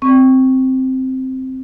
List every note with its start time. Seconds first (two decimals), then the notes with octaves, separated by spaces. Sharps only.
0.02 C4 C#6